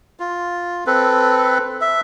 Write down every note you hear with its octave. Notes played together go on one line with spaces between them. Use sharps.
F4
C4 A4 B4
E5